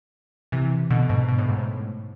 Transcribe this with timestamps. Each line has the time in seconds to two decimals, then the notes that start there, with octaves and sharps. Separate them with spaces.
0.52 C3 E3
0.90 B2 D3
1.09 G#2 B2
1.28 B2
1.38 A2
1.49 G#2
1.59 A2